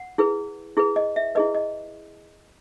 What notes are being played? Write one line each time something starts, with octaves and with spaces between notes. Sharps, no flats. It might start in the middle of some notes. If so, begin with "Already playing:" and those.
Already playing: F#5
E4 G#4 B4
E4 G#4 B4
D#5
E5
E4 G#4 B4 D#5
D#5